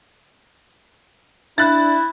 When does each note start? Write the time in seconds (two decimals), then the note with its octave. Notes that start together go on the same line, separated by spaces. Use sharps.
1.58 D4 E4 E5 F#6 A6